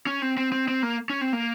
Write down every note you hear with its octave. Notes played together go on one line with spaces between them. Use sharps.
C#4
C4
C4
C4
C4
A#3
C#4
C4
A#3